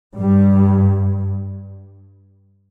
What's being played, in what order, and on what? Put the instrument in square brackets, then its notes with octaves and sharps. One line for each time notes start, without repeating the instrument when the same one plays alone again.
[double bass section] G2 G3